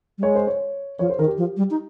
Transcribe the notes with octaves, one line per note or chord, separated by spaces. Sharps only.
G3
G#3 C#5
C5
C#5
F3 C#5
C5
D#3 A#4
G4
F3
G3
D#4